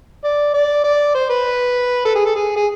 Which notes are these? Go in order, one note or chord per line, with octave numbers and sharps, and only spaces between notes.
D5
D5
D5
C5
B4
A4
G#4
A4
G#4
G#4